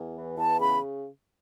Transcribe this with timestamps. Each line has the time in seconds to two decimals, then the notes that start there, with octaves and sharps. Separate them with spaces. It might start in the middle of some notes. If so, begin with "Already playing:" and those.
Already playing: E2
0.15 E3
0.38 E2 A5
0.60 C#3 B5